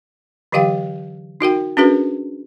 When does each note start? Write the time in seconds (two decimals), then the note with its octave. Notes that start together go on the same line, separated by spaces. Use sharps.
0.52 D3 E3 F#3 G4 F5 G5
1.41 D#4 F#4 A#4 G5
1.77 C#4 D4 F#4 G#4 A#4 B4